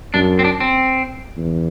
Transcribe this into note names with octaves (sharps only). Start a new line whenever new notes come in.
F#2 D4
C4
D4
C4
E2